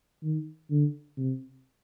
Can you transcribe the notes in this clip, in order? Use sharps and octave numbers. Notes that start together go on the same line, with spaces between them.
D#3
D3
C3